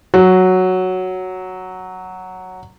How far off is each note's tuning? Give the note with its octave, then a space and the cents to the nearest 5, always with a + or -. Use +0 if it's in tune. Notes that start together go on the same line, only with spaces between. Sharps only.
F#3 +0